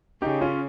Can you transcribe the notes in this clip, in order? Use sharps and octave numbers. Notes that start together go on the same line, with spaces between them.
C#3 D#4 G4
C#4 F4